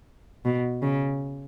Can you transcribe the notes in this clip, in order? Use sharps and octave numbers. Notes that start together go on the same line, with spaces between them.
B2
C#3